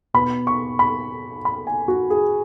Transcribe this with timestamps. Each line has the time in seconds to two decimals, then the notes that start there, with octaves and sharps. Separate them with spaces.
0.14 B2 B3 B5
0.47 C#6
0.79 B5
1.45 B5
1.67 G#5
1.88 F#4
2.10 G#4